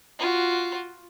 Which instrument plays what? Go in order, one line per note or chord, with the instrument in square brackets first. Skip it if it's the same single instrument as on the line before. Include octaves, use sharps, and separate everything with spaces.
[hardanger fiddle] F4 F#4